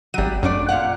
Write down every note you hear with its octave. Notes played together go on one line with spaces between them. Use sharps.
G#1 F#3 G3 D#7
F#2 A3 D4 D5
A#2 F5 F#5